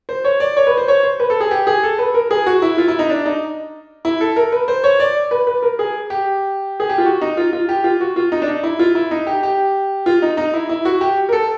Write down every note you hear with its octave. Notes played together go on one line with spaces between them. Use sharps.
C5
C#5
D5
C#5
B4
C5
C#5
C5
B4
A4
G#4
G4
G#4
A4
B4
A#4
G#4
F#4
E4
F4
E4
D#4
D4
D#4
E4
A4
A#4
B4
C5
C#5
D5
B4
B4
A#4
G#4
G4
G#4
G4
F4
F#4
D#4
F4
F4
G4
F4
F#4
F4
D#4
D4
D#4
E4
F4
E4
D#4
G4
G4
F4
D#4
D#4
E4
E4
F#4
G4
A#4
A4